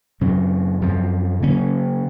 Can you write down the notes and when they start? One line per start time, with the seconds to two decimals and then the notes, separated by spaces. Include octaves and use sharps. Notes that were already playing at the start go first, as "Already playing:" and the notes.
0.21 F#2 C#3 F#3 C4
0.82 F#2 F3 C4
1.42 C#3 F#3 A#3 C#4